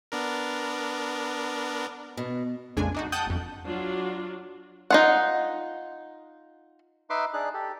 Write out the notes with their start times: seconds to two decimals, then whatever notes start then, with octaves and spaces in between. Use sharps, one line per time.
0.12 B3 D4 A#4
2.17 B2
2.77 A#1 F2 C#3 G#3 D4 G#5
2.95 D4 D#4 F#4
3.12 F#5 G5 A5 D#6 F#6 G6
3.26 G1 F2
3.67 F#3 D4 F4
4.90 D#4 F4 F#5
7.10 D#4 B4 E5 C6 D6
7.34 D4 D#4 G#4 F#6
7.54 G4 A4